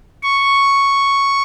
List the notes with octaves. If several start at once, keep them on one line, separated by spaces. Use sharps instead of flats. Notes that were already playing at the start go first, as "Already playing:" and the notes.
C#6